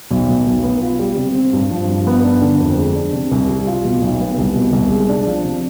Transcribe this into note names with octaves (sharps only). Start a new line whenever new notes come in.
B1
B2
B1
B3
F4
G3
C3
C4
G2
F3
G2
B3
D4
D3
F2
G#3
D4
C3
C2
G3
F4
B2
B1
B3
C2
B2
C2
G#3
D4
F3
C3